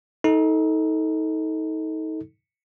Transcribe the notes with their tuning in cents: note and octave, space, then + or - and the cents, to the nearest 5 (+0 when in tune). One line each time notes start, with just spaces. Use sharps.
D#4 +30 A4 +0